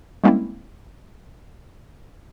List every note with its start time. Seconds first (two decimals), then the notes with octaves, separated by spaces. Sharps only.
0.24 G3 G#3 A#3 C4 C#4 E4